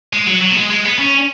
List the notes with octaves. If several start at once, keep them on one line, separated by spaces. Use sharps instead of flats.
G#3
F#3
F#3
B3
G#3
G#3
B3
C#4